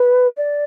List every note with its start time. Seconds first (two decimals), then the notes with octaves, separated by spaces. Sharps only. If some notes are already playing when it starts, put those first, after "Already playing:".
Already playing: B4
0.37 D5